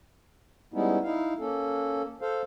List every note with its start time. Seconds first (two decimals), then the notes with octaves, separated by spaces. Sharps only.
0.74 G3 G#3 B3 C#4 D#4 E4
1.04 D#4 E4 F5
1.39 A#3 C#4 A4
2.22 A4 C5 F5